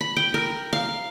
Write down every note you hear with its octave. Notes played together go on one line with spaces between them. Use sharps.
B5
G5
A#4
F5